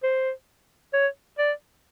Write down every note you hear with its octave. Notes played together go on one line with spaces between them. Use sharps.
C5
C#5
D5